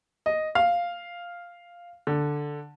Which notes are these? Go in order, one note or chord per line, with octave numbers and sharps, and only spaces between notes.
D#5
F5
D3